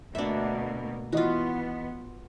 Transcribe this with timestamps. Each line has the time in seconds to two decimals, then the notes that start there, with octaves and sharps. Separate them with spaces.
0.15 D2 B2 A#3 D4 E5
1.13 E3 B3 F4 F#4 D#5